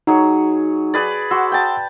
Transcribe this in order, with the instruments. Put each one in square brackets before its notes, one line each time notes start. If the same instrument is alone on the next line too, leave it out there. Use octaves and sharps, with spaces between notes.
[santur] F#3 G#4 C#5 [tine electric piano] D#4
[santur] G#4 B4 D5
[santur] F#4 [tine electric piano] F#5 C6 E6
[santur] G5 A5